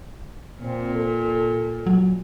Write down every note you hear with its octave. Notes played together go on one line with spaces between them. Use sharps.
A#2 C4
A4
F#3